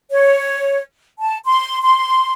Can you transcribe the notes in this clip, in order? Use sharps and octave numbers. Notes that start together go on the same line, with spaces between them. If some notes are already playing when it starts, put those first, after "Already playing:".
C#5
A5
C6
C6